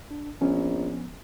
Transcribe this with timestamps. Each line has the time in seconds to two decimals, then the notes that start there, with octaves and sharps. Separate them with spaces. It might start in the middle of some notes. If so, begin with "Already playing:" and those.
0.11 D4
0.41 A#1 F3 B3 C#4